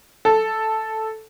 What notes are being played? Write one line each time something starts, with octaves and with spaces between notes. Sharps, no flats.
A4